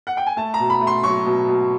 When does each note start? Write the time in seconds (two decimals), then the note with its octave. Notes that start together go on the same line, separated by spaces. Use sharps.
0.07 F#5
0.17 G5
0.27 G#5
0.37 A3 A5
0.54 A#5
0.59 B2
0.70 B5
0.81 A3
0.87 C6
1.03 F#3 C#6
1.26 B2
1.48 B2